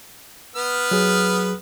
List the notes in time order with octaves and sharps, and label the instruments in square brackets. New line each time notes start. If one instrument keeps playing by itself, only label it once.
[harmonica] B3 B4 F6
[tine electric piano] F#3 G#4